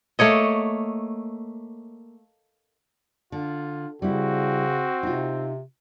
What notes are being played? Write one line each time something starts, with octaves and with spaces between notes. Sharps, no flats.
A3 A#3 C#5 D#5
D3 F4
C#3 G3 C4 E4 F#4
C3 D#4 F4